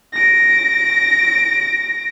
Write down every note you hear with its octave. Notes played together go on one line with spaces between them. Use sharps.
A#6 D7